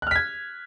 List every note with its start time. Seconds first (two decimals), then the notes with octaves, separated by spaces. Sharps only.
0.02 F#6
0.07 F6
0.11 B6
0.16 G#6